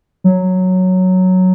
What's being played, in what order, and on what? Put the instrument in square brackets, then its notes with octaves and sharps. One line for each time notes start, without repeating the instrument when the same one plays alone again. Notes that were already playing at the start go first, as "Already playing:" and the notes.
[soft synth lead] F#3